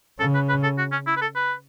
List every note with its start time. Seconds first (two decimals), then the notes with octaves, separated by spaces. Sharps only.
0.19 C#3 A4
0.34 B4
0.49 B4
0.63 A4
0.78 F#4
0.92 C#4
1.07 E4
1.17 B4
1.21 A4
1.36 B4